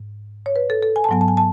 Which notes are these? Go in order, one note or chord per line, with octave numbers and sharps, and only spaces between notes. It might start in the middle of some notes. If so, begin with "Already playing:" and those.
Already playing: G#2
C#5
B4
A4
A4
G#5
A5
G#2 F#3 B3 G#5
A5
G#5
A5